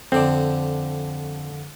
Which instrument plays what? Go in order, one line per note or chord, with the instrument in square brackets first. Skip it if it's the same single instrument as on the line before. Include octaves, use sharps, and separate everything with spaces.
[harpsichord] F2 D3 [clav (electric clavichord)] C4 D5